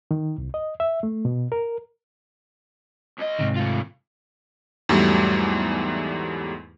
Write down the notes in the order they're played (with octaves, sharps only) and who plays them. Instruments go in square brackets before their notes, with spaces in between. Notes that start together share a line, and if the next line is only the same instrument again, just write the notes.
[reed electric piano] D#3
C2
D#5
E5
A3
B2
A#4
[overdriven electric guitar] C#2 D#5
[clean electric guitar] G#2 C3 D#3
[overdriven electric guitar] A3 F4
[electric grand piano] E2 G#2 F#3 G3 A3